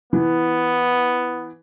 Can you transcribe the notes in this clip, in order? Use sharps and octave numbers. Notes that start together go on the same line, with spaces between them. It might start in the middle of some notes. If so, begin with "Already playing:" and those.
E3 B3